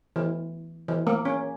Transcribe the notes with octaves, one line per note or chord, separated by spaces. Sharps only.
E3
E3
A#3
C#4